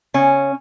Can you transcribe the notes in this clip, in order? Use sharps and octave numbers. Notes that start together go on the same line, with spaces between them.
C#3 C#4